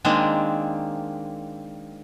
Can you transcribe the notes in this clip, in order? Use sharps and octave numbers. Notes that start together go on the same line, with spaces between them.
D#3 G#3 A#3 C4 D4